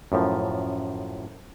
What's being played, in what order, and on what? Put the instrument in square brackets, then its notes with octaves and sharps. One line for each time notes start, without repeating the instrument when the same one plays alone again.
[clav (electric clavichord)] F#2 A2 F3